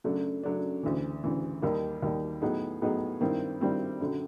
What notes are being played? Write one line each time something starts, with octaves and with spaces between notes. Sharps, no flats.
F#2 C#3 F#3 A3 D4
F#2 C#3 F#3 A3 D4
D2 C#3 E3
D2 C#3 E3
D#2 D#3 G3
D#2 D#3 G3
A2 F#3 B3 D#4 G#4
A2 F#3 B3 D#4 G#4
G2 D#3 G3 C4 E4
G2 D#3 G3 C4 E4
F#2 D3 F#3